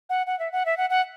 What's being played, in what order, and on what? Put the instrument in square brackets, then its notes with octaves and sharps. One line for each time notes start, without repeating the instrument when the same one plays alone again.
[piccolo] F#5
F#5
E5
F#5
E5
F#5
F#5